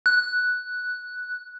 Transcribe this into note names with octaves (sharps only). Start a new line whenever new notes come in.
F#6